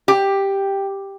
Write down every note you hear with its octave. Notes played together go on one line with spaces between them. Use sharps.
G4